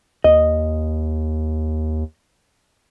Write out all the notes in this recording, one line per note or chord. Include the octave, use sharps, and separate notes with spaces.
D#2 D#5